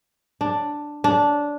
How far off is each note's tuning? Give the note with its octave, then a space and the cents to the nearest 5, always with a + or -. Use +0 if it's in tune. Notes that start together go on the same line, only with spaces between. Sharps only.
D4 +5
D4 -10